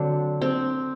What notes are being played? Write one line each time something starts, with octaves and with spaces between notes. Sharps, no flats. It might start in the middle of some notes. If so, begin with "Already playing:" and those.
Already playing: D3 F#3 C4 D4
C4